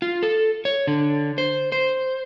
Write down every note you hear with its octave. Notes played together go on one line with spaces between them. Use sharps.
F4
A4
C#5
D3
C5
C5